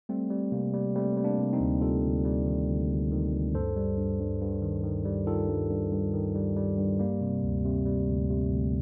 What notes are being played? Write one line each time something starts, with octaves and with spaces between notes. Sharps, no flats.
G3 A3 C4
G3
C3 A#3
G3
G3 A3 C4
G3
A#3 D4
C3
C4 D#4
D2
G3 F4 A4
D2
G3
D#3
D2
D2
D#3
D2
G2 A4 C5
G3
G2
G2
G2
D#3
D#3
G3
D#3 F4 A4
G2
G2
G2
D#3
G3
G3
G2
G3 A#3
C3
D2
C3
G3
D2
C3
D2